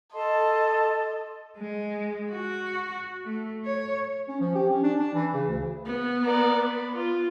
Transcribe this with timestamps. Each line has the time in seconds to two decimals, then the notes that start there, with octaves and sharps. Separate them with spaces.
0.13 A4 D#5 A5 C6
1.58 G#3
2.31 F#4
3.25 A3
3.65 C#5
4.28 C#4
4.40 F3
4.55 G4
4.70 C#4
4.83 D4
4.99 D4
5.14 E3
5.33 C#3
5.48 D2
5.86 B3
6.24 A#4 D5
6.64 B4
6.95 F4